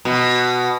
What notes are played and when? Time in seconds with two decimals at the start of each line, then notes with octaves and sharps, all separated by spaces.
0.05 B2